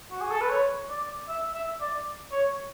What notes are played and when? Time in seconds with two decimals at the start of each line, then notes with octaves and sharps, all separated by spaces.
0.11 F#4
0.21 G#4
0.31 A4
0.41 B4
0.50 C#5
0.89 D5
1.28 E5
1.54 E5
1.81 D5
2.32 C#5